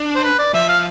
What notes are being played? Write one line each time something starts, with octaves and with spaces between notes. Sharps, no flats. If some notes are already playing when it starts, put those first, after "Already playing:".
Already playing: D4
C5
B4
D5
F3 E5
F5